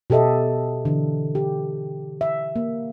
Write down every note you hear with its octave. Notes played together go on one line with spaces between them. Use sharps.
B2 G4 A4 D#5 E5
D3 E3
G4
E5
A#3